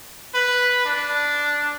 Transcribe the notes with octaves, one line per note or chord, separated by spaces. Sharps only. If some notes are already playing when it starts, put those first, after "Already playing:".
B4
D4